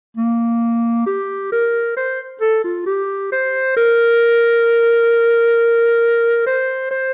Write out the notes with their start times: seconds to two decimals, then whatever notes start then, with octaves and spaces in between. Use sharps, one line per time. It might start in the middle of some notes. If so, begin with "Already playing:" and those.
0.17 A#3
1.07 G4
1.52 A#4
1.97 C5
2.42 A4
2.64 F4
2.86 G4
3.32 C5
3.77 A#4
6.47 C5
6.91 C5